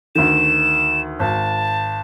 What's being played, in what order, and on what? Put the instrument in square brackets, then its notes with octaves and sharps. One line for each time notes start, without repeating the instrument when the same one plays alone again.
[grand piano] D2 D#3 [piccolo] E7
[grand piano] G#1 [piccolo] A5